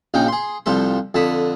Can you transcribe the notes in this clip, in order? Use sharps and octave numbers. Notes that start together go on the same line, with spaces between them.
A#1 C#3 D#4 G5
G#4 C6
C2 F3 G3 A4 C6
F2 D3 A5 B5 D#6